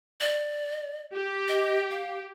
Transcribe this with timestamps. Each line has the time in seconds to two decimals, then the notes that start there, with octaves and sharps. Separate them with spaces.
0.21 D5
1.14 G4
1.48 D#5
1.91 F5